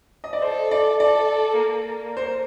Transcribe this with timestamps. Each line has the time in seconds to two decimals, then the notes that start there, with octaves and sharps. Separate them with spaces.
0.24 D#5
0.33 D5
0.42 A4 C5
0.71 D5
1.00 A4 D5
1.59 A#3
2.17 C5